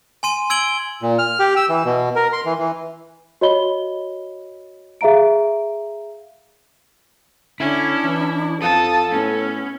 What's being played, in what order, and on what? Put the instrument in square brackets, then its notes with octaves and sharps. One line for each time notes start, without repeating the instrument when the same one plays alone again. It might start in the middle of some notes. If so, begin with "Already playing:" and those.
[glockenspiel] G#5 C6 D#7
E6 G#6 D7 F#7 G7
[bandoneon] A#2
F6
G4
E6
E3
B2
A#4
C6
E3
E3
[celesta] F#4 C#5 D#5 B5 G7
G#4 E5 F5 A#5 D7
[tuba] D3 [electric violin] C#4 [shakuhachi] D4 [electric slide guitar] E4
[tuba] E3
[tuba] F2 [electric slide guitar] A4 [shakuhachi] F5 [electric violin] A5 D#6
[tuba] A2 [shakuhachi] B3 [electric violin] C#4